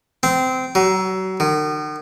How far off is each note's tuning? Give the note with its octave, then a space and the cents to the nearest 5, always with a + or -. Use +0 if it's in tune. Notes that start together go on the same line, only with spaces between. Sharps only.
C4 -20
F#3 +30
D#3 -40